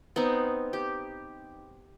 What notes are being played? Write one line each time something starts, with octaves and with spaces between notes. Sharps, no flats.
B3 C4 D#4
G4